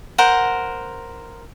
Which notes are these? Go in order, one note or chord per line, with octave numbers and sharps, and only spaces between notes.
A#4 C5 F#5